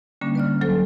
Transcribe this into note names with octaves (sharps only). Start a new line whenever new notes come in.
D3 G3 A#3 C#4 D4
B4 D5 F6
F#3 A4 C5